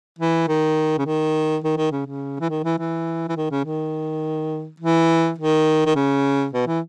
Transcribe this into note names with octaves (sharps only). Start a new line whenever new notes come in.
E3
D#3
C#3
D#3
D#3
D#3
C#3
C#3
E3
D#3
E3
E3
E3
D#3
C#3
D#3
E3
D#3
D#3
C#3
B2
E3